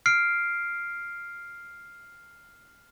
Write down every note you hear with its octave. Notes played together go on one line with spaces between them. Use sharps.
F6 C7 D7